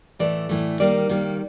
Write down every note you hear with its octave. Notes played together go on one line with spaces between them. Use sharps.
A2 E3 A3 D5
A2 E3 A3
D#3 G3 A#3 D5
D#3 G3 A#3